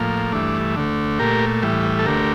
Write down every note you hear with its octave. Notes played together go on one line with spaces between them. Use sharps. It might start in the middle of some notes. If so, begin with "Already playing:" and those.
Already playing: A2 F3 A#3
G2 E3 A3 D4
D2 D3 A3
A#2 A3 G4 A#4
A2 E3 G3
A4
D2 D3 A3 G4 A#4